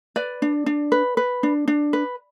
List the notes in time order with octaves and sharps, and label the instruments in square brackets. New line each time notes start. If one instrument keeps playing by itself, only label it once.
[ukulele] B4 D5
D4
D4
B4
B4
D4
D4
B4